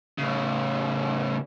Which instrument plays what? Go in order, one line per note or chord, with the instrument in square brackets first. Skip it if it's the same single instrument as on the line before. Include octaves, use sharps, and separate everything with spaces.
[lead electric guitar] A2 C#3